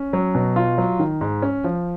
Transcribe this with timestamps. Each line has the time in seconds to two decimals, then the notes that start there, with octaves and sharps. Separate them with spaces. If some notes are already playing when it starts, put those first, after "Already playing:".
Already playing: C#4
0.13 F#3
0.35 B2
0.56 F4
0.78 F#3
0.99 D#3
1.21 G#2
1.42 C#4
1.64 F3